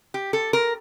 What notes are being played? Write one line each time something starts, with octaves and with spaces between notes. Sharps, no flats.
G4
A4
A#4